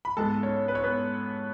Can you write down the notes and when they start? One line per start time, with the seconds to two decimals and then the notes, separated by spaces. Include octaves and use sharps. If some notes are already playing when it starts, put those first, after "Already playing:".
0.05 B5
0.17 G#2 G#3 B3 A4 A5
0.43 C#4 C#5
0.68 B4
0.75 C#5
0.83 B3 B4